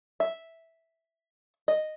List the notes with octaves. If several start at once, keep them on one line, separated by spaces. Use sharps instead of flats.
E5
D#5